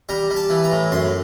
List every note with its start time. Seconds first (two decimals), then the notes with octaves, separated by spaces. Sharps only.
0.09 G3 A#5
0.30 G3
0.36 A5
0.50 E3
0.64 A#5
0.72 A2
0.91 F#2 C6